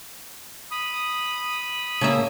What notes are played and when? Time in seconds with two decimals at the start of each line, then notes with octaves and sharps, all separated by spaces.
0.71 B5 D#6
2.01 C#3 A#3 E5